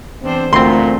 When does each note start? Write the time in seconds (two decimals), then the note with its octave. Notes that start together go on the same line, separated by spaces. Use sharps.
0.23 E2 C4 D4 C5
0.53 D2 A#2 A3 C4 C6